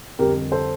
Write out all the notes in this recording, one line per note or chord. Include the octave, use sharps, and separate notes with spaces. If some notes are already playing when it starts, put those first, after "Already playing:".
F2 D3 G3 G4 A#4
A4 C5